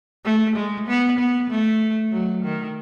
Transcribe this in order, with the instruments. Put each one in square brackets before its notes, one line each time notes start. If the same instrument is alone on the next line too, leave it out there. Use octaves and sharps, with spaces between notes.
[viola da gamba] A3
G#3
B3
B3
A3
F#3
D#3